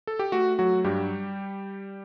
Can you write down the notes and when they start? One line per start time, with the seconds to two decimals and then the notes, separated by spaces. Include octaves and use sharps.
0.07 A4
0.19 G4
0.32 A3 F#4
0.59 F#3 F#4
0.84 G2 G3 G4